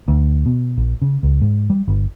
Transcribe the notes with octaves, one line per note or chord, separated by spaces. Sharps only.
D2
B2
A#1
C#3
C#2
G#2
G3
G1